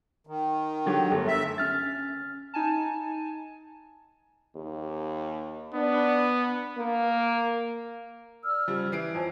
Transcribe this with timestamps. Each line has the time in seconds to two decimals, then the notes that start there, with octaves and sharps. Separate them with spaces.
0.27 D#3
0.86 D3 F#3 G4
1.11 G1 A3
1.27 E5
1.58 C#4 F6 A6
2.54 D#4 G#5 A5
4.56 D#2
5.74 B3 D4
6.78 A#3
8.44 D5 E6 F6
8.68 C#3 F3 G3
8.92 E3 E5 C7 D7
9.14 F2 C5 C#5 G#5